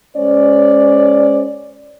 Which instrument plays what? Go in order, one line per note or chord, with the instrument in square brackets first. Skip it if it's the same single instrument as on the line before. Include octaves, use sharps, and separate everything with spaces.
[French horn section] G#3 C#4 C5 D5